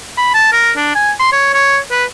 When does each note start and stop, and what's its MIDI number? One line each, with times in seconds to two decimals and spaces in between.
0.17 0.31 83
0.34 0.48 81
0.52 0.71 70
0.76 0.93 62
0.95 1.11 80
1.19 1.32 84
1.32 1.51 73
1.53 1.78 73
1.91 2.04 71